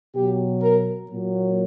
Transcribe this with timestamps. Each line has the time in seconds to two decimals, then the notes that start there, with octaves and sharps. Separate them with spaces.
0.15 B2 F#3 G4
0.61 A#4
1.07 A#2 F#3